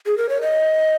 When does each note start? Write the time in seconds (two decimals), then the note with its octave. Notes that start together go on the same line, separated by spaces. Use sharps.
0.06 G#4
0.18 A#4
0.29 C#5
0.41 D#5